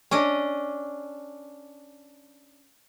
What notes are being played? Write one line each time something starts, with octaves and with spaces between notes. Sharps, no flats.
C#4 D4 D#5